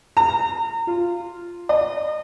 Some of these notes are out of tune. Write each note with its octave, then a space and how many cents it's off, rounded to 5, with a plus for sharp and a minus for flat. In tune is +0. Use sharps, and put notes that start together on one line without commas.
A#5 -35
F4 -5
D#5 -30